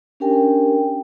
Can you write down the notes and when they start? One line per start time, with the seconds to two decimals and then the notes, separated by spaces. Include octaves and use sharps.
0.20 C#4 D4 G4 A#4 G5 G#5